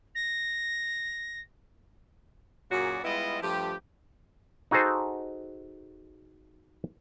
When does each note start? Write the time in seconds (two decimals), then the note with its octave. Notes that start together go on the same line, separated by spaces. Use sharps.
0.15 A#6
2.71 F#2 A#2 F#3 F#4 G#4 D5
3.04 G3 G#3 B3 E4 F4 D#5
3.42 G2 F3 A3 G4
4.71 D#4 F#4 G#4 A4 C5